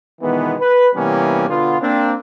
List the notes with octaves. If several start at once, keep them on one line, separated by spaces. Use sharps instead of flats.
B2 D#3 E3 G#3 B3
B4
C3 E3 G3 A#3 B3 C#4
B2 D3 B3 F4
A#3 C4 D4